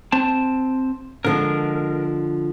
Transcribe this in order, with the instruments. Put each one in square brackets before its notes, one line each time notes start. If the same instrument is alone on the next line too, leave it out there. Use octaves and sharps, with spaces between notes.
[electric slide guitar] C4 A5
[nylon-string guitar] D3 F3 G#3 [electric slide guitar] A#4